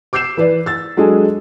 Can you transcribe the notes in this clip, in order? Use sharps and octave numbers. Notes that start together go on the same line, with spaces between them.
D6 E6 G6 C7 E7
E3 B4 D5
E6 A6
F#3 G#3 D4 G#4 A4